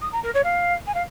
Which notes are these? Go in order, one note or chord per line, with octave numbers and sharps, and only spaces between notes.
D#6
A#5
A#4
C#5
F5
G#5
F5